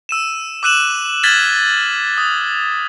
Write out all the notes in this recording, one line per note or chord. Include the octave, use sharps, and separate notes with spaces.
E6 D#7 E7
D6 E6 F#6 D#7 E7 F#7
F6 G#6 A6 B6 F#7 G7
D#6